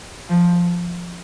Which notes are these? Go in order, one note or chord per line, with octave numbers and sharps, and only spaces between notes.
F3